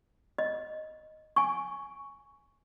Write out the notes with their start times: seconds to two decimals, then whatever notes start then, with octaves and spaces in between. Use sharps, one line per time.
0.38 D#5
1.36 G#5 C#6